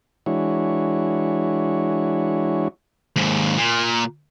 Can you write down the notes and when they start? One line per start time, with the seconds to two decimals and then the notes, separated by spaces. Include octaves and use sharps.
0.26 E3 G#3 D4 E4 F#4 C#5
3.16 D#2 G#2
3.57 A#2